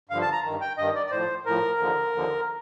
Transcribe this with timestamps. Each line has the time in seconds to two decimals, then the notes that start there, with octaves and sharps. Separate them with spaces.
0.09 G2 D3 F3 F5
0.22 A5
0.32 A#5
0.44 G2 D#3
0.61 G5
0.77 G2 D#3 D#5
0.95 D5
1.06 D5
1.11 A2 F3 C5
1.46 A2 F3 A#4
1.79 D#2 D3 F3
2.13 D#2 D3 F3